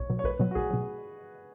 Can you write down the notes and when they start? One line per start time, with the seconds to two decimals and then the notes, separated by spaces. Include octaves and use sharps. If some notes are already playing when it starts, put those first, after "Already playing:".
Already playing: B1 C#5
0.10 B2 F#3
0.19 C#5
0.24 B1 B4
0.40 B2 F#3
0.51 F#4
0.55 B1 G#4
0.71 B2 F#3